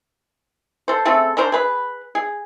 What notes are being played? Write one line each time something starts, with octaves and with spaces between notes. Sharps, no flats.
A4 C5
C#3 A3 C4 A4
C#4 D4 A#4 C5
G#4 B4
G#4